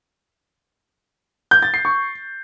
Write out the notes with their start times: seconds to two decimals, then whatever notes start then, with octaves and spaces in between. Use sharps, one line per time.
1.51 G6
1.63 A6
1.74 C7
1.85 C#6